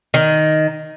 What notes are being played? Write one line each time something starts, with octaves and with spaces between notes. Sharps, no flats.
D#3